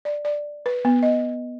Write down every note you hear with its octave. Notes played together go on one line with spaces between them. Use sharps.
D5
D5
B4
B3
D#5